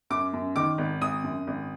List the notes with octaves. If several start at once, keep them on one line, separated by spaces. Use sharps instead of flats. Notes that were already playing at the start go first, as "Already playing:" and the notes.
F#2 D6
F#2
D#3 D6
G#1
G#1 D#6
F#2
G#1